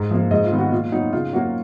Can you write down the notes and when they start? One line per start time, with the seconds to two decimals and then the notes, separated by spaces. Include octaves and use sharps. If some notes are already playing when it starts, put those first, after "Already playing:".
Already playing: G#2
0.11 F3 A#3
0.31 G#2 D#5
0.44 F4
0.51 D#3 G#3 B3
0.58 F#4
0.72 A#2 F4
0.92 F#3 B3 D#4
1.13 C#3 F4
1.33 F#3 A#3 F#4